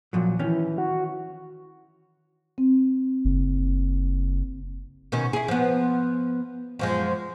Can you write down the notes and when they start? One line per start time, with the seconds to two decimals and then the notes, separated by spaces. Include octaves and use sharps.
0.13 A#2 F3 F#3
0.39 D#3 E3 C#4
0.78 F#4
2.58 C4
3.25 F#1
5.12 B2 D#3 C#4
5.33 E4 G#4
5.48 F3 B3
6.79 F#2 F3 G#3